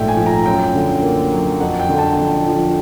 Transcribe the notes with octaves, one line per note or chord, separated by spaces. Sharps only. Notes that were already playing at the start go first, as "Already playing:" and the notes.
Already playing: A#1 G#2 A3 E5 G5
G#5
F3
A#5
F#2 G5
D3
A#3
F#3
F2 F#5
G5
D3
A5
F2
F3